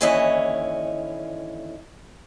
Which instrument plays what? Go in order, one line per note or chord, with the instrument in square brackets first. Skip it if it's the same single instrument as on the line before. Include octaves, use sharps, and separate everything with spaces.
[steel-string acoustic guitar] D#2 D3 E3 C#4 E4 D#5